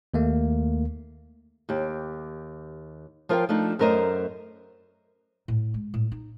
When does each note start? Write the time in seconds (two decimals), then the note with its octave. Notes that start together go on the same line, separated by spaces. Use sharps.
0.14 D#2 A3 A#3
1.69 D#2 G4
3.29 F3 F4 A#4 E5 F5 G5
3.49 F3 A3 D4 D#4
3.79 F#2 A3 A#4 C5 D#5
5.48 A2
5.74 G#3
5.94 A2
6.12 D#4